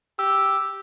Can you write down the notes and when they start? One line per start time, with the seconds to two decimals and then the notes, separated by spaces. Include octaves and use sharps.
0.19 G4 E6